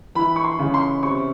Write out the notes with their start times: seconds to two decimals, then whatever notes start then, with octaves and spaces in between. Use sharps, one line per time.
0.15 E3 B5
0.36 C#6
0.45 C6
0.59 C#3
0.74 C6
1.03 C3 C#6